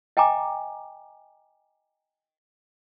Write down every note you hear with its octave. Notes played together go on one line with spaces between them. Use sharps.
D#5 G5 G#5 A#5 D6